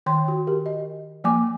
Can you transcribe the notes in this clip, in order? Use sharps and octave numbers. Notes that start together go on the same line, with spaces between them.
D#3 G5 C6
F#4
G4 A#4
D#5
F3 A#3 G#5 D6